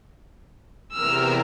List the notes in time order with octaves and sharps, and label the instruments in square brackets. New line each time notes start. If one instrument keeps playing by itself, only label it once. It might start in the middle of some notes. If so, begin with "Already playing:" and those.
[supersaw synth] E2 C3 A#4 [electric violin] E6 F6